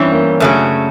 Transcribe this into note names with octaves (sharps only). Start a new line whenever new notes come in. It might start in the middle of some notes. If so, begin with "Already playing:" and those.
Already playing: G2 E3 G3 C4 C#4
A#3
F#2 C#3 F#3 A3